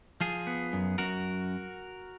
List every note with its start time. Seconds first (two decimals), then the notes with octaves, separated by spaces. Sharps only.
0.21 F3 F4 G#4
0.47 B3
0.73 F#2
0.98 F#2 F#4 A#4